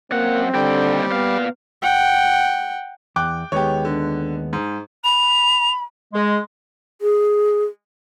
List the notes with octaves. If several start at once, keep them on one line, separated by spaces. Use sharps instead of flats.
F#2 A#3 C4 F#5
D#2 D3 G3 G5
A#2 B3 F5
F#5 G5
E2 G5 D6 F#6
D#2 G#3 B3 G4 C#5
D3
G#2
B5 F7
G#3
G#4